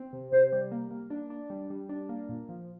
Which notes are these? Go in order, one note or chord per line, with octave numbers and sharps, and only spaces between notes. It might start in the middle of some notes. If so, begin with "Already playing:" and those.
Already playing: C4
C3
C3 C5
G3
A#3
A#3
D4
D4
G3
G3
D4
A#3
A#2
F3